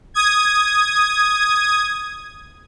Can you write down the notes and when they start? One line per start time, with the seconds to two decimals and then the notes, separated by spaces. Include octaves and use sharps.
0.14 D#6 G#6